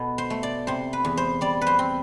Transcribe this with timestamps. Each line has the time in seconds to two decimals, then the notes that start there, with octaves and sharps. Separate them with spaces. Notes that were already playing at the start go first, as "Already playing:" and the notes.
Already playing: B2 A4
0.18 C5
0.30 A3
0.43 D5
0.67 C3 C5
0.93 B4
1.05 E2
1.17 C5
1.41 G3 D5
1.61 B4
1.67 C5
1.79 C4